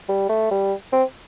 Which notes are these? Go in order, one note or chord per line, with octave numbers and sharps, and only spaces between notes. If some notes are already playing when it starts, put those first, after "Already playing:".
G3
A3
G3
C4